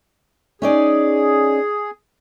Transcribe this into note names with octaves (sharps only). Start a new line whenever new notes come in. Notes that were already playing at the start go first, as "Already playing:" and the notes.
C#4 D#4 G#4 D5